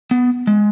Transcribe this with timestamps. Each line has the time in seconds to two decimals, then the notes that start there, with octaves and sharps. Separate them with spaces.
0.11 B3
0.47 G#3